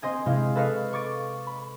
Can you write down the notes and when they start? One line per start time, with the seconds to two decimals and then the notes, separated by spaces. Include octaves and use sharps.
0.02 C4 C5 D#5 G#5
0.26 C3 G#3 E4 C5 F5
0.55 A4 B4 D#5 F5 C#6
0.93 C#6 D6 A6 D7
1.47 B5